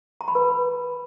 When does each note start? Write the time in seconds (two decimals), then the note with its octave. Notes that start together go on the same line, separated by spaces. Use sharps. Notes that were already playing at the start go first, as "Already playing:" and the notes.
0.21 A#5
0.28 B5
0.35 B4